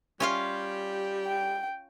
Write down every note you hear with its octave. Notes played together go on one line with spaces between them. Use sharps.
G3 C#4 F4 G4 F5
G5